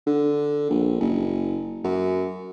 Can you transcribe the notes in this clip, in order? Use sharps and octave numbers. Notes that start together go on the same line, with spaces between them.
D3
A#1
F#1
F#2